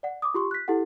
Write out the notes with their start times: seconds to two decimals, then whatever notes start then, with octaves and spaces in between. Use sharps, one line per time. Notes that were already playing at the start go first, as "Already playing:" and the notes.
0.03 D5 F#5
0.22 D6 D#6
0.34 F4 G4 C6 C#6
0.51 F#6 B6
0.68 E4 G4 A4 F#5